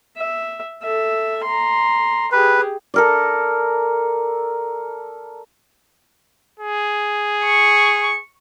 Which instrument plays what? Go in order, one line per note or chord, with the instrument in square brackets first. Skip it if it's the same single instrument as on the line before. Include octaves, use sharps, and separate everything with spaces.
[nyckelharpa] E5
A4 E5
A#5 C6
[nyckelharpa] G4 G#4 [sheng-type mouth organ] B4
[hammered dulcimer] A4 A#4 D5
[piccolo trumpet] G#4
[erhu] C#6